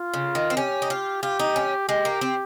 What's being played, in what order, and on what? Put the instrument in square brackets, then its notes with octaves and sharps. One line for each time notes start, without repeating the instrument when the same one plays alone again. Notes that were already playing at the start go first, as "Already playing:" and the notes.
Already playing: [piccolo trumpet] F4
[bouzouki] C#3
D#3
C4
[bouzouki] C#4 [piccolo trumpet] G4
[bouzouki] D#4
F4
[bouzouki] F4 [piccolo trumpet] G4
[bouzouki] D#4
C#4
[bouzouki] G#3 [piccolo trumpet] G4
[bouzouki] A#3
C4